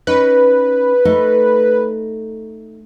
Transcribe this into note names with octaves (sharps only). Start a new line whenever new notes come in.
C#4 D#4 B4
A3 D#4